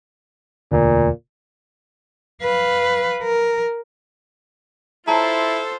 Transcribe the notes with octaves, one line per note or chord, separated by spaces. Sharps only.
E1 D2 A#2 D3
B4 F5
A#4
E4 F4 A4 C5 C#5 A5 A#5